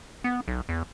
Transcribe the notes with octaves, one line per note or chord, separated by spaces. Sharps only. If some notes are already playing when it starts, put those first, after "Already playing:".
B3
B1
E2